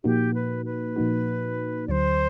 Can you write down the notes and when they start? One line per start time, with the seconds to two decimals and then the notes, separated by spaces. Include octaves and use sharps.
0.04 A#2 F3 A#3 D#4 F#4 G4
0.34 B4
0.65 B4
0.96 A#2 F3 A#3 D#4 F#4
1.88 D2 D3 F#3 C5 D5